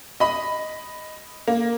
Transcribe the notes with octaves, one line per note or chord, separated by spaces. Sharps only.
D#5 B5
A#3